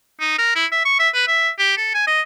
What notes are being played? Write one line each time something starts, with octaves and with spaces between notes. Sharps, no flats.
D#4
A#4
E4
E5
C#6
E5
B4
E5
G4
A4
G#5
D#5